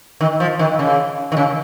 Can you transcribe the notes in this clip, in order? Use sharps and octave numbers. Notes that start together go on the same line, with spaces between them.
D#3
F3
D#3
C#3
D#3
C#3